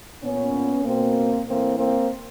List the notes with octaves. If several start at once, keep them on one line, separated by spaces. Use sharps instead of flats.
A#2 B3 C#4
B2 A#3 C4
A2 E3 A#3 C4
A#3 C4